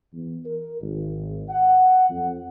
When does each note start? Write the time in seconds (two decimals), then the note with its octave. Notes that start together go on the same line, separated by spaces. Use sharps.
0.13 E2
0.46 A#4
0.81 G#1
1.49 F#5
2.10 F2